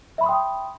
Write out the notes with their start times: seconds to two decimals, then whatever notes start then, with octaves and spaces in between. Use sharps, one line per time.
0.18 E5
0.21 B5
0.24 C6
0.26 D#6
0.29 G5